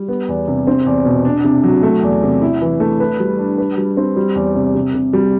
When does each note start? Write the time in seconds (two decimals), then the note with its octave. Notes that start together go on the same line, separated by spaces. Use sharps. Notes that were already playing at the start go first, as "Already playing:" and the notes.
Already playing: G3
0.08 B3
0.28 E2
0.47 C3
0.67 C4
0.86 E2
1.05 B2
1.25 D4
1.44 C3
1.63 F#3
1.83 A3
2.03 E2
2.23 C3
2.42 E4
2.61 E3
2.80 A3
3.00 B4
3.20 G3
3.39 D4
3.58 B4
3.78 G3
3.97 C4
4.16 G3
4.36 E2
4.55 C3
4.75 C3
4.94 C3
5.13 G3